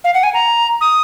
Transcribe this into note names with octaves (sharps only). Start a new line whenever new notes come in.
F5
F#5
G#5
A#5
D#6